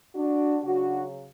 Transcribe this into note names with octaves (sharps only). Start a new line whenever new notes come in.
D4 F#4
C#3 F#3 D4 F#4